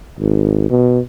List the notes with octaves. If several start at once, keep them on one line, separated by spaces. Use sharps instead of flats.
G#1
B2